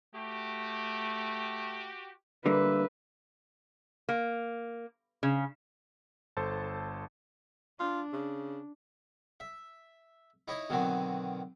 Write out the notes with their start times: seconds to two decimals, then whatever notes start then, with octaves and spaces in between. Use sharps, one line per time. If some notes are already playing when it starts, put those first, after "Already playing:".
0.15 A3 F#4 G4
2.46 D3 G3 A#3 B4 E5
4.09 A#3
5.23 C#3
6.37 G1 A4 C5 A5 A6
7.80 D4 F4
8.13 C#3
9.40 E5
10.48 D#4 E4 C#5 D#5
10.70 B2 D3 D#3 F#3 C4